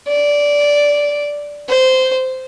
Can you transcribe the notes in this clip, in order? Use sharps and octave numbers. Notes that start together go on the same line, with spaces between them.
D5
C5